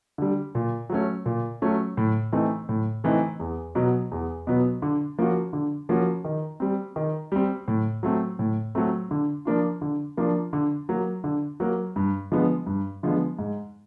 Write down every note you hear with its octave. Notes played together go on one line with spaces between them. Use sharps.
D3 G3
A#2
F#3 A3 C#4
A#2
F#3 A3 C#4
A2
E3 A3 C4 D#4
A2
E3 A3 C4 D#4
E2
B2 F#3 B3
E2
B2 F#3 B3
D3
F3 A#3 C#4 F#4
D3
F3 A#3 C#4 F#4
D#3
G3 C4
D#3
G3 C4
A2
F#3 A3 C4
A2
F#3 A3 C4
D3
F3 A#3 D4 F4
D3
F3 A#3 D4 F4
D3
F#3 A#3
D3
F#3 A#3
G2
D3 F3 G#3 B3
G2
D3 F3 G#3 B3
G#2